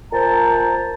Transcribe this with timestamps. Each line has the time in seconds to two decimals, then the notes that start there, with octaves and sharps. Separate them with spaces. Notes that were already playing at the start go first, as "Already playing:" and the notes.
0.13 A#2 C5 A5 A#5